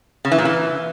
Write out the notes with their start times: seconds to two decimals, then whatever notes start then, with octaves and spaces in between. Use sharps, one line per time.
0.25 C#3
0.32 E3
0.38 A#2
0.45 E3